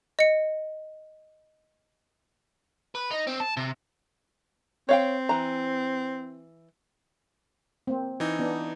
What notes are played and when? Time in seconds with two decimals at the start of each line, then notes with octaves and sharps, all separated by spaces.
0.19 D#5 C#7
2.95 B4
3.11 D#4
3.27 C4
3.40 A5
3.57 C3
4.89 C4 C#5 F5 G5
5.29 E3 A#5
7.87 A#3 C4
8.20 E3 D#4
8.39 B3 D4